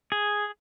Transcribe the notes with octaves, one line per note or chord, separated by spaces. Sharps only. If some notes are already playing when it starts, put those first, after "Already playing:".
G#4